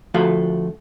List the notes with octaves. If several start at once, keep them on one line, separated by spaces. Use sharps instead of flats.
D2 F3 A3 F#4 F5